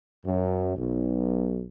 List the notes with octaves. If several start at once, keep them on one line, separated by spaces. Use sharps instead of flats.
F#2
B1